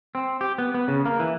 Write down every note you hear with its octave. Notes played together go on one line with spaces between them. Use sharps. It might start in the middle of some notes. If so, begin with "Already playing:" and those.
C4
G4
B3
B3
C#3
A#3
E3